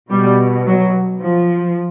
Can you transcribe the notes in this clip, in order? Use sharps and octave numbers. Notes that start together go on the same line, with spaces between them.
B2 G3
F#3
F3